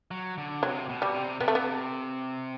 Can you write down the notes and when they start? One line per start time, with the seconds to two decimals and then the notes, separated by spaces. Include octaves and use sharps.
0.11 F#3
0.38 D3
0.63 C3 F#3
0.89 B2
1.02 G3
1.14 C3
1.40 C3 B3
1.48 A3
1.55 B3